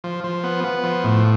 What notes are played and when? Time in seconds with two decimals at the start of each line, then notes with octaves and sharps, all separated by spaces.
0.04 F3
0.24 F3
0.44 B3
0.64 B3
0.84 F3
1.04 A2